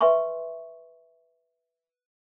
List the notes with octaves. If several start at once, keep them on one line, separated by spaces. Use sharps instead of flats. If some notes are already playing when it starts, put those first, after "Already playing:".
B4 E5 G#5 C6 C#6